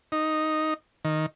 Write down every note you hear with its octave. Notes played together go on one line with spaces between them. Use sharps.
D#4
D#3